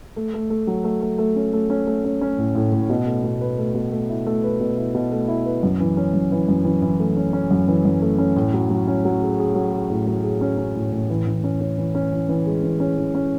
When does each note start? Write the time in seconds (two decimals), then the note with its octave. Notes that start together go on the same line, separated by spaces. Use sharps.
0.16 A3
0.34 A3
0.50 A3
0.67 F#3
0.84 A3
1.02 A3
1.18 A3
1.36 C#4
1.53 A3
1.70 C#4
1.87 A3
2.05 C#4
2.21 C#4
2.38 A2
2.55 A2
2.72 A2
2.90 B2
3.06 A3
3.24 B2
3.41 B4
3.59 A3
3.74 B2
3.92 A3
4.09 E4
4.26 A3
4.44 B4
4.60 B2
4.78 E4
4.95 B2
5.12 A3
5.28 E4
5.45 B4
5.63 F#2
5.80 E3
5.97 C#4
6.14 F#2
6.32 E3
6.48 F#2
6.65 E3
6.82 E3
6.99 A3
7.17 C#4
7.33 C#4
7.51 F#2
7.68 E3
7.85 F#2
8.02 A3
8.18 C#4
8.36 A2
8.54 F#3
8.70 F#3
8.88 C#4
9.05 F#3
9.21 G#4
9.38 G#4
9.55 F#3
9.73 G#4
9.90 A2
10.07 F#3
10.24 G#4
10.41 C#4
10.58 C#4
10.75 A2
10.92 A2
11.10 E3
11.27 E3
11.44 C#4
11.61 C#4
11.78 E3
11.95 C#4
12.12 E3
12.29 E3
12.46 G#3
12.64 E3
12.80 C#4
12.97 E3
13.15 C#4